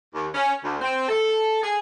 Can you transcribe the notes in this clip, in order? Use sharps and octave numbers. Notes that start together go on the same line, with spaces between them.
D#2
C#4
D2
C4
A4
G#4